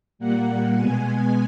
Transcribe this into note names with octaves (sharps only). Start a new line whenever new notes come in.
A#2 G3 A#3 F#5
B2 G#3 B3 G#5